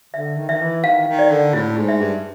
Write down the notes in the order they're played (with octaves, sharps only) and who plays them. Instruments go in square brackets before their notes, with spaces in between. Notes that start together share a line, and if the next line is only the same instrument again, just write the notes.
[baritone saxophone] D3 [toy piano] E5
[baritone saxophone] D#3
[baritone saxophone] D#3 [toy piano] E5
[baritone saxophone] E3
[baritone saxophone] D#3 [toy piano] F5
[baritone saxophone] D#3
[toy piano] D5
[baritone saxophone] D3
[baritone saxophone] A2 [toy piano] E4
[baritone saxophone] G#2
[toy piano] E5
[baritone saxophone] G2